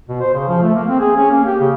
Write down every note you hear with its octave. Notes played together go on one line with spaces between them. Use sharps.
B2
C5
C#3
F3
A3
A#3
C4
G#4
C#4
A#3
G4
C#3